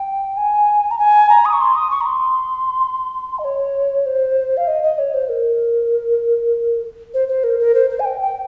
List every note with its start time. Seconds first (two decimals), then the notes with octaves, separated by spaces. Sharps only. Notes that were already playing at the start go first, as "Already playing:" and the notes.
Already playing: G5
0.37 G#5
0.91 A#5
0.99 G#5
1.29 A#5
1.45 D#6
1.53 C#6
1.60 C6
1.76 D#6
1.91 C#6
2.01 A#5
2.06 C6
3.39 D#5
3.45 C#5
4.06 C5
4.57 F5
4.67 D#5
4.83 D#5
4.99 C#5
5.14 C5
5.29 A#4
7.14 C5
7.28 C5
7.44 A#4
7.59 A#4
7.75 C5
7.90 C5
8.00 G#5
8.05 G5
8.21 G5